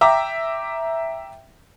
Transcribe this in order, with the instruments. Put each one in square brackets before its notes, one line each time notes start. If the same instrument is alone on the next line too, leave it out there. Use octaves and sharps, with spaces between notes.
[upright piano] E5 G5 A#5 D6